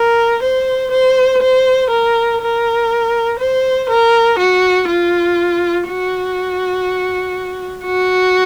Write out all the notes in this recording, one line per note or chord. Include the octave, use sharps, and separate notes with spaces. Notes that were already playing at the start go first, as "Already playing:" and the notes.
Already playing: A#4
C5
C5
C5
A#4
A#4
C5
A#4
F#4
F4
F#4
F#4